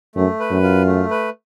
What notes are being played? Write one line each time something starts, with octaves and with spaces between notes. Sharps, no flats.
F#2 A3
B4
F#2
F4
A3
B4